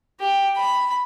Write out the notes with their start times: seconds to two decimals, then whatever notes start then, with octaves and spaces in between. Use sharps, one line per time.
0.21 G4
0.57 B5